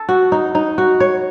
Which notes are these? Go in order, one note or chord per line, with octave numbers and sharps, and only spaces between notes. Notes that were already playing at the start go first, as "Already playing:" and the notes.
Already playing: A4
F#4
D#4
D#4
F#4
C#5